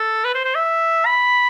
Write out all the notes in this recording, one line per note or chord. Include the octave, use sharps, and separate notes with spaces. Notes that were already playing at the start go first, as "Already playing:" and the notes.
Already playing: A4
B4
C5
C5
E5
B5